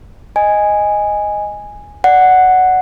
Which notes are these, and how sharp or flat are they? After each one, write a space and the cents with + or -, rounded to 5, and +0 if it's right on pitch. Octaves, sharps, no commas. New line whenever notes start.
D#5 +0 G#5 -5
D5 +0 F#5 +0